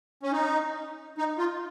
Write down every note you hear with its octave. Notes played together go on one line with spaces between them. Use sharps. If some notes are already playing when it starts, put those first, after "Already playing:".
C#4
D#4
D#4
F4